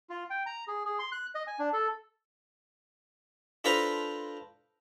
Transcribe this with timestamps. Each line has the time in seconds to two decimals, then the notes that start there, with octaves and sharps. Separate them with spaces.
0.10 F4
0.30 G5
0.46 A#5
0.68 G#4
0.85 G#4
0.99 C6
1.12 F#6
1.35 D#5
1.47 G#5
1.59 D4
1.73 A4
3.64 D4 F4 A4 B4 C5 A#5